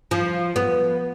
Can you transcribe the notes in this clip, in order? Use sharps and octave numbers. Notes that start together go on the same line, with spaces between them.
F3
B3